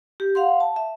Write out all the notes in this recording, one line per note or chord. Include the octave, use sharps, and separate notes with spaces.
G4
F5 F#5 C6
A5
E5